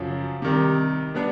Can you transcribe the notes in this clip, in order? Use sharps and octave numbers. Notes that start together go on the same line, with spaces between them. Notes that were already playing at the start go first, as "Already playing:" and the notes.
Already playing: F#2 C#3 F3
C3 D#3 G3
G3 B3 D4